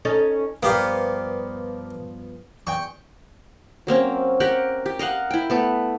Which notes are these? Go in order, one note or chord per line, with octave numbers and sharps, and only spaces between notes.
C#4 D#4 A4
G2 F3 A#3 B3 G4 F5
E2 G5 C#6
F#3 A#3 C4 C#4
G4 A#4 F#5 G5
G4
A#4 D#5 F5 F#5
E4 G5
A3 B3 A4